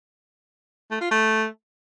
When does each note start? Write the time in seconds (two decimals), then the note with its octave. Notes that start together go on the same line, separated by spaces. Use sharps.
0.91 A3
1.01 F4
1.11 A3